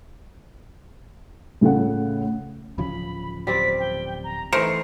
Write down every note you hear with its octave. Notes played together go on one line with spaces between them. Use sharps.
A2 C#3 F4 A4 F#5
D1 C#3 F3 B5
G3 C4 D5 B6
G5
A#5
E3 A3 D#4 A#4 C5 C7